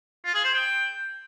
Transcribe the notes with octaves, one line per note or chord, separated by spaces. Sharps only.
F4
G#4
C5
G5